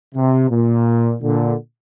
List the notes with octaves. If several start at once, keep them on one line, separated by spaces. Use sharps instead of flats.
C3
A#2
A#2 D3